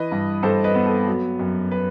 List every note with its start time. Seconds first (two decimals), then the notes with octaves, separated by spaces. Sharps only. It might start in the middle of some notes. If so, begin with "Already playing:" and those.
Already playing: E3 B4 D#5
0.11 G2
0.43 G2 A4 C5
0.64 B4 D#5
0.75 B3
0.86 A4
1.07 F#3
1.39 F#2
1.71 B4